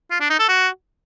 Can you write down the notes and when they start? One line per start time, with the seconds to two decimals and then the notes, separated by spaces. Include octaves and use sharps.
0.11 F4
0.20 D4
0.30 D#4
0.39 A4
0.49 F#4